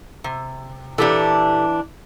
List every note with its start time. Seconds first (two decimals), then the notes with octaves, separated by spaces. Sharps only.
0.24 C3
0.98 A#2 E3 D4 G4 A4